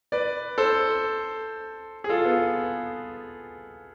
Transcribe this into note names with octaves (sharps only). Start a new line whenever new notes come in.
B4 D5
A4 C5
G#4
F4 A4
B3